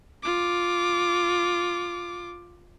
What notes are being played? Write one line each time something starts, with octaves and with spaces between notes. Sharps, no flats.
F4 D6